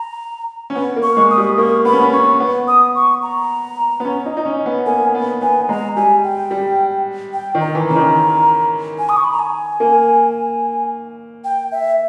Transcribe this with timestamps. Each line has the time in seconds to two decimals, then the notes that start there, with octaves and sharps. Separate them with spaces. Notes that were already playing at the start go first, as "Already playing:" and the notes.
Already playing: A#5
0.70 C#4
0.75 B3
0.96 A#3
1.03 C#6
1.17 G#3
1.31 D#6
1.38 G3
1.58 A#3 C#6
1.85 B3 B5
1.93 C#4
2.00 B3
2.13 C#4 C#6
2.40 B3
2.68 D#6
2.95 C#6
3.23 A#5
4.00 B3
4.05 C#4
4.25 D#4
4.37 D#4
4.45 C#4
4.66 B3
4.86 A#3 G#5
5.15 B3
5.42 B3 G#5
5.69 G#3 A#5
5.96 G3 G#5
6.24 G5
6.51 G3
7.34 G5
7.55 D#3
7.61 A#5
7.75 E3
7.88 C#3 A#5
7.96 D#3
8.98 G#5
9.09 D#6
9.17 C#6
9.24 B5
9.32 A#5
9.39 G#5
9.80 A#3
11.45 G5
11.72 E5